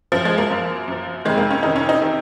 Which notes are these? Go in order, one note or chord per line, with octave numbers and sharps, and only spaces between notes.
F#2 F3
G#3
A#3
F#2 F3
F#2 F3
F2 C3 D#3 G#3
A#3
C#4
F2 C3 D#3 D#4
C#4
D#4
C3 D#3